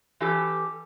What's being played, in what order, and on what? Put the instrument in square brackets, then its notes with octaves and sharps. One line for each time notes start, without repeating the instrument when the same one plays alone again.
[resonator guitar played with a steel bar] E3 C#4 G4 A4